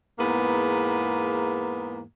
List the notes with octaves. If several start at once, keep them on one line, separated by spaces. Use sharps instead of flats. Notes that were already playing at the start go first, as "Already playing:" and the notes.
E2 G#2 A#3 B3